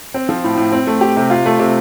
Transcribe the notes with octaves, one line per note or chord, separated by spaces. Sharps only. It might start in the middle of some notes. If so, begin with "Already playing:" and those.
C4
F3
A2
A2
C4
A3
G4
C3
F4
A3
C3